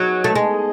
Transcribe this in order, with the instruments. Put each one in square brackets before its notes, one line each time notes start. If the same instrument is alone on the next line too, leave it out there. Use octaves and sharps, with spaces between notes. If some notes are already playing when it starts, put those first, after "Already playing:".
Already playing: [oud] F#3 [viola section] B3 D#4 G#4 D#5
[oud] A3
G#3